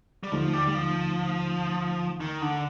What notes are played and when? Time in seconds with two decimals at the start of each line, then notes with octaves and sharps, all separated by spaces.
0.23 G3
0.32 D#2 D3 F3 A3 D#4
0.53 G3
0.67 G3
0.75 F3
2.20 D#3
2.41 D3